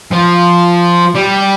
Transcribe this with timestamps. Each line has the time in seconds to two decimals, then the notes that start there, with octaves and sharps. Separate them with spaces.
0.12 F3
1.15 G3